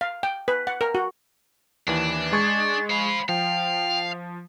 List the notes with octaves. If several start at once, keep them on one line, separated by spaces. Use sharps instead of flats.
F5
G5
B4
F#5
A#4
F#4
D#2 E3 D4
G#3 C#6 G#6 A6
C5 F5 B5
F3 F5 G5